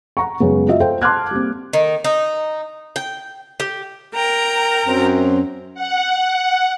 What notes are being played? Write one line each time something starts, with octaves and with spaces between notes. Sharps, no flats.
F#5 A#5 C#6
F#2 C#3 G#3 B3
F4 F#4 D#5 E5
A4 C5 F5 G5
A5 C6 D6 F6 F#6 G#6
G3 A#3 C4
D#3
D#4
G5
G4
A#4 G5 A#5
F#2 C4
F#5